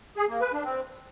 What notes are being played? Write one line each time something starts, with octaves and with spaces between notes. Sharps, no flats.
G#4
A#3
B4
D4
C4